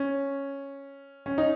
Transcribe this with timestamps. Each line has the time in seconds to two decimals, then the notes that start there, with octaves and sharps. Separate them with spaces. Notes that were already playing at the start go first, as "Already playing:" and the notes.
Already playing: C#4
1.26 C#4
1.38 D#4